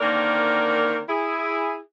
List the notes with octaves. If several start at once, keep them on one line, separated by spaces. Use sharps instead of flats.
D3 D#3 A#3 C4 A#4 D5
E4 G#4